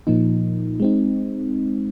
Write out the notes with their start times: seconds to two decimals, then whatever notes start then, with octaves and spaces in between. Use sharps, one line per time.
0.07 A#2 F3 A#3 D#4
0.80 G#3 C4 D#4